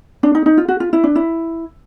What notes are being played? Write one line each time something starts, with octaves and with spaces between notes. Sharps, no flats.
D4
D#4
D#4
F4
F#4
F4
E4
D4
E4